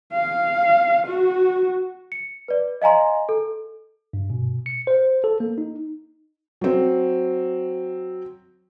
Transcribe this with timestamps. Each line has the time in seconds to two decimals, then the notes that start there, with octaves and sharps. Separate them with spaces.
0.13 F5
1.07 F#4
2.12 C#7
2.48 B4 D5
2.82 D#5 F5 G#5 A#5 C6
3.29 A4
4.13 G2
4.30 B2
4.66 C#7
4.87 C5
5.24 A4
5.40 A#3
5.58 D#4
6.61 F#3 C4